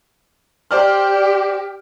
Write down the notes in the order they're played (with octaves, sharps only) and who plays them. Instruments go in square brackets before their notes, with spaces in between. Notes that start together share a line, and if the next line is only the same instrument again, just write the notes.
[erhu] G4 [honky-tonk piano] C5 D5 F6